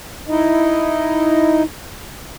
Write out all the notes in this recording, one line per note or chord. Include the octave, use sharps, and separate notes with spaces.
D#4 E4 D#5